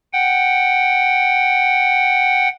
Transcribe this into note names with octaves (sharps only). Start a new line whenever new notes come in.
F#5 G5